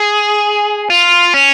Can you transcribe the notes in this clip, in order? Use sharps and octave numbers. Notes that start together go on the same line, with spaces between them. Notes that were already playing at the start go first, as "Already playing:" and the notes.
Already playing: G#4
F4
C#4